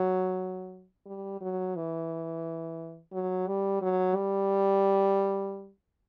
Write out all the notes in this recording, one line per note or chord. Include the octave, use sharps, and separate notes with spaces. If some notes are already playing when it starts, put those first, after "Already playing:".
Already playing: F#3
G3
F#3
E3
F#3
G3
F#3
G3